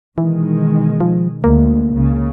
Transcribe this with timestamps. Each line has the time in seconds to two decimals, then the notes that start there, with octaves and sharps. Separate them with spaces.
0.18 B2 D#3 E3 G#3
1.01 F3
1.44 D2 G#3 A#3
1.92 C#2 C#3